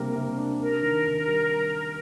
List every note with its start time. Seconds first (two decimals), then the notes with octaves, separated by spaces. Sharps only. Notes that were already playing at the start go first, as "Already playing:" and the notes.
Already playing: C3 G3 A#3 D4 A#4
0.15 C3
0.37 D4
0.60 D4 A#4
0.82 D#3
1.05 D#3
1.27 G3